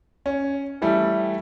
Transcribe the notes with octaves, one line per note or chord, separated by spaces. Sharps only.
C#4
E3 G3 A3